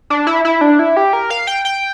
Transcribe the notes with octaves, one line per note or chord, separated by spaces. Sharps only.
D4
E4
E4
D4
E4
G4
A#4
F5
G5
G5